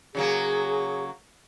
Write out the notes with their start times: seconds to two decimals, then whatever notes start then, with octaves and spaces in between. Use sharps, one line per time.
0.15 C#3 F#3 A#3 G#4